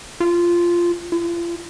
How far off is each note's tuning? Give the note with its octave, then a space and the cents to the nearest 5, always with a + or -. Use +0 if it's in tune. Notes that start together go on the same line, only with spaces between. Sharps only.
F4 -10
F4 -40